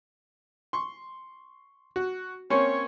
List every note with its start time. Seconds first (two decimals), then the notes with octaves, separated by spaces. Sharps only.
0.73 C6 C#6
1.96 F#4
2.50 A#3 C4 C#4 C#5